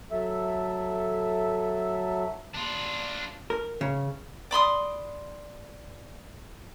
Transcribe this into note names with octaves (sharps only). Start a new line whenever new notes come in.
F#3 A4 E5
D4 F4
A#4
C#3
D5 B5 C6 D#6